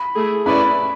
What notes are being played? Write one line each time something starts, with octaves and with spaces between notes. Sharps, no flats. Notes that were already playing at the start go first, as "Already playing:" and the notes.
Already playing: B5
A3 E4 G#4
C#4 E4 G#4 B4 D5 B5